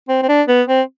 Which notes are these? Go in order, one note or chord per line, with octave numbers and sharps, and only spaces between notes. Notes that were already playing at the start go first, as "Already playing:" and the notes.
C4
C4
D4
B3
C4